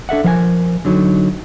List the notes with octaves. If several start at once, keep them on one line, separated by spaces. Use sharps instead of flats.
D4 A4 E5 F#5
F3 A#4 F5 G#5
D3 F#3 D#4